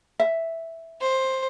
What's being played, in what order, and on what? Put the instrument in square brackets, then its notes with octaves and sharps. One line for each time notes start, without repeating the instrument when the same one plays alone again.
[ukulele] E5
[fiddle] C5